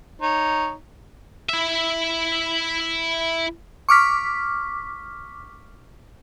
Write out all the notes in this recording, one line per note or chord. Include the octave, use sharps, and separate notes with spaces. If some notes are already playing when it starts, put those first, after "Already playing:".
D#4 C#5
E4 E5
C#6 D6 F6 B6